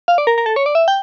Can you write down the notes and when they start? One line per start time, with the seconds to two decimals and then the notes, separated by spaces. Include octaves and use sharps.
0.08 F5
0.18 D5
0.27 A#4
0.38 A#4
0.46 A4
0.56 C#5
0.66 D5
0.75 E5
0.88 G5